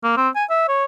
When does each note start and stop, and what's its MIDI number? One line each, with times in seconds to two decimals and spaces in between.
0.04 0.14 58
0.17 0.29 60
0.36 0.44 80
0.50 0.68 76
0.68 0.85 73